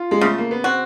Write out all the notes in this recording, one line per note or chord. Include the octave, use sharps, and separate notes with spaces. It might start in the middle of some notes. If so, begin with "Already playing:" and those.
Already playing: F4
G#3
C#3 A3
A#3
B3
C4 F#4